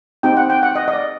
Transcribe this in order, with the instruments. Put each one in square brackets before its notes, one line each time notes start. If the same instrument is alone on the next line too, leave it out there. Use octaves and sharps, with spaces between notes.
[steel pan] C4 D#4 G4 G5
F#5
G5
F#5
D#5
D#5
D5